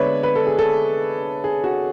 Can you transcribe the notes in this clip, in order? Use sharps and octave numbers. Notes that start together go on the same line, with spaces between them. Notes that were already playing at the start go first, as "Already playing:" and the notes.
Already playing: D3 G#3 B3 D4 B4 C#5 D5 E5
B4
A4
G#4
A4
G#4
F#4